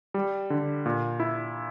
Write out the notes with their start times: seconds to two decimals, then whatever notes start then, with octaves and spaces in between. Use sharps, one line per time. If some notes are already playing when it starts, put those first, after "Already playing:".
0.14 G3
0.50 D3
0.86 A#2
1.20 E4